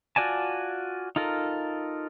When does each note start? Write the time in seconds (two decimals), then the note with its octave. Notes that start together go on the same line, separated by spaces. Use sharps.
0.16 F4 F#4 D5 G#5 A5
1.16 D#4 F4 A4 A#4